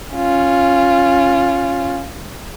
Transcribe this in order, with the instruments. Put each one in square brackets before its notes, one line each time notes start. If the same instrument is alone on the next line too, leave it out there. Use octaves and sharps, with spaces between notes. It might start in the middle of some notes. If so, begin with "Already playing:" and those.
[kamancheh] C#4 F4